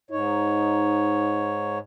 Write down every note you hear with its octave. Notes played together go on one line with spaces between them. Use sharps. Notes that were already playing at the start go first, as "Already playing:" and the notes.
G#2 D#4 C#5